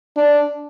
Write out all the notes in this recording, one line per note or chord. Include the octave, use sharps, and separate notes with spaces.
D4